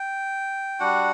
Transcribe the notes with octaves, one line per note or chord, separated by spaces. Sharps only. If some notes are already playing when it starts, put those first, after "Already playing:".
Already playing: G5
G3 D4 F#4 F#5